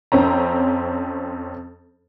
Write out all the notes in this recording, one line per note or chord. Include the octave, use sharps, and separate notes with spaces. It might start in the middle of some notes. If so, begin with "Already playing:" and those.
F2 C4 C#4 A#5